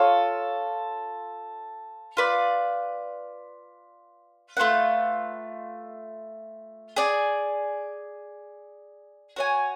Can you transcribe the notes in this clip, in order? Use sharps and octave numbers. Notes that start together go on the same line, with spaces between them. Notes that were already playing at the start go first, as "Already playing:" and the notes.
Already playing: F4 A4 C#5
F4 B4 D5
A3 F4 B4 F#5
G#4 D5 G#5
F#4 C#5 G#5